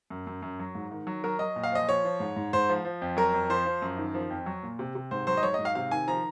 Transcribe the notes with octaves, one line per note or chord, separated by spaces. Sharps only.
F#2
F#2
F#2
F#3
G#2
D#3
F#3
F#3 A#4
F#3 D#5
A#2
F5
F3 D#5
F3 C#5
F3
G#2
G#2
G#2 C5
F3
F3
F2
F#3 A#4
F2
F3 C5
F3
F#2
D#3
F3
F2
F#3
A#2
C3
C3
G#2 C5
F#3 C5
D#5
F#3 C#5
G#2 D#5
F5
C3 F5
D#3 G#5
F3 A#5